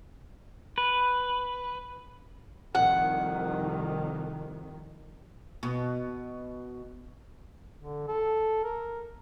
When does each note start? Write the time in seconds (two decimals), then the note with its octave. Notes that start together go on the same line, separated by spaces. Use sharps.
0.78 B4
2.75 C2 F2 D#3 F#5
5.63 B2
7.82 D3
8.08 A4
8.64 A#4